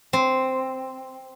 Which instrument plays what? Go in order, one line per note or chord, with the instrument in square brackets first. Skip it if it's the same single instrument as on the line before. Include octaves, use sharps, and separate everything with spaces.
[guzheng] C4